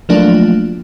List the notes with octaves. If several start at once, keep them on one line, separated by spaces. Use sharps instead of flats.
F3 F#3 A3 A#3 D4 F4